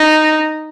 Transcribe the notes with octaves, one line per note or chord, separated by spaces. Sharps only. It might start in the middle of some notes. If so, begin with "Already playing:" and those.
Already playing: D#4